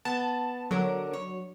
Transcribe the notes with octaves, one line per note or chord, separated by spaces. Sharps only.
B3 A5
D3 F#3 A#4
C#5